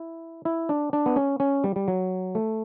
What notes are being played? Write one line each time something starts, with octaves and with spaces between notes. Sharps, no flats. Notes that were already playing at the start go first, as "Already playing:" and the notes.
Already playing: E4
E4
D4
D4
B3
C#4
C#4
G3
G3
F#3
A3